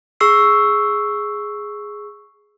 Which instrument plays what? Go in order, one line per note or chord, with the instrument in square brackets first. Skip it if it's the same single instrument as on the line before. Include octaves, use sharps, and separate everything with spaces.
[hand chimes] G#4 C#6 E6 C7